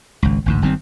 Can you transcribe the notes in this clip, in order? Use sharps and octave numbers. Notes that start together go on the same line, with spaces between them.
G#1 C#2
A1 D2 G#2
G1 D#3 G3 C4